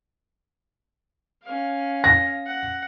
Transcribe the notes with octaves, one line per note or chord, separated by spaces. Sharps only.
C#4 F5
A#6
F#5